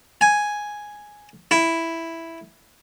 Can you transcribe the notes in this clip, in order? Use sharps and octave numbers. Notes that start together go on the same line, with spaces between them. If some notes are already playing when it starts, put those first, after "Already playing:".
G#5
E4